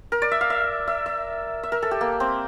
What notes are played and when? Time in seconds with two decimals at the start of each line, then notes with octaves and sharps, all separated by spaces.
0.12 A#4
0.22 D5
0.31 E5
0.41 F5
0.50 E5
0.87 E5
1.06 E5
1.63 E5
1.72 A#4
1.82 A4
1.91 G4
2.01 A#3
2.20 C4